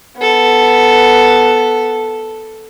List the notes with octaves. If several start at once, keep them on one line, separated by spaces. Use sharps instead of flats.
B3 A4